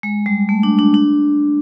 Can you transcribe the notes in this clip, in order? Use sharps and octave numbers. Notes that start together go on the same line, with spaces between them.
G#3
G3
A3
D4
D4
D4